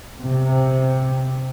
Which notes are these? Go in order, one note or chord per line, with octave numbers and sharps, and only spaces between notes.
C3